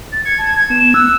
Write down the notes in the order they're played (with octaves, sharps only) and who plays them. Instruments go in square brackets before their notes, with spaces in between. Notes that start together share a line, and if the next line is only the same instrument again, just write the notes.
[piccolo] A6
[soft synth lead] G#6 [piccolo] C#7
[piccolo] A5
[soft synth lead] B3 [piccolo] E7
[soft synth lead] E6 [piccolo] F#6